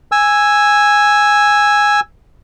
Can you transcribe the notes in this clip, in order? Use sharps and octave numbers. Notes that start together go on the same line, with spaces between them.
G#5 E6